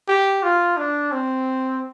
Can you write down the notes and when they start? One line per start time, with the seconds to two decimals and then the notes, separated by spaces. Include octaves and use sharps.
0.08 G4
0.43 F4
0.77 D4
1.12 C4